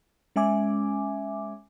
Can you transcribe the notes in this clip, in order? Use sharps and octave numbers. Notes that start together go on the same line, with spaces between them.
G#3 C#4 E5 G#5 D6